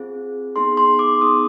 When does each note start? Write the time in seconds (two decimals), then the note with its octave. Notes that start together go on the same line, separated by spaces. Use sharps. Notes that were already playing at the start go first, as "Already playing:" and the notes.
Already playing: C4 F4 G#4
0.56 B3 D#4 G#4 C6
0.77 C6
0.99 D6
1.22 B3 D#4 G#4 D#6